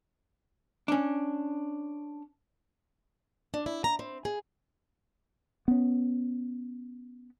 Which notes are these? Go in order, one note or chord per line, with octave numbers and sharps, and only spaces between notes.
C#4 D4
D4
E4
A#5
C4
G#4
B3 C#4